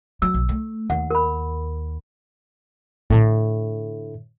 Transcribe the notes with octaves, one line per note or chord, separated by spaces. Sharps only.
F#3 E6
B1
A3
D#2 F#5
A#4 B5
A2 D3